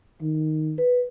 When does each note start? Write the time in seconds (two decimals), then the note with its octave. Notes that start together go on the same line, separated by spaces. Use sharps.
0.21 D#3
0.78 B4